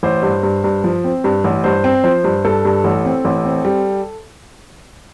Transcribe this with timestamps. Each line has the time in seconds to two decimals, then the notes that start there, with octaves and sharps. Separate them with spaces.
0.03 A1 C5
0.23 G2
0.43 G2
0.64 G2
0.84 F3
1.04 C4
1.24 G2
1.44 A1
1.64 G2 C5
1.84 C4
2.04 F3 C5
2.24 G2
2.45 G2 A4
2.65 G2
2.84 A1
3.05 C4
3.25 A1
3.45 C4
3.65 G3